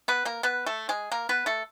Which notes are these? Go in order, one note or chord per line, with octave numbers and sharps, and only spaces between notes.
B3 B4
A#3 A#4
B3 B4
A3 A4
G#3 G#4
A#3 A#4
B3 B4
A3 A4